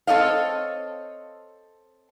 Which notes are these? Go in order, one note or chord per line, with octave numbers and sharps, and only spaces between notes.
C4 A4 C#5 D#5 F5